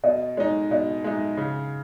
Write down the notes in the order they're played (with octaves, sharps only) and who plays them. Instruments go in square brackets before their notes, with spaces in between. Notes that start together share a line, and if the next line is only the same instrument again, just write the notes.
[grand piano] B2 [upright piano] D#5
[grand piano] G#3 D#4 [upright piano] C#5
[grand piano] B2 [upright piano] D#5
[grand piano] G#3 D#4 [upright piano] E5
[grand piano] C#3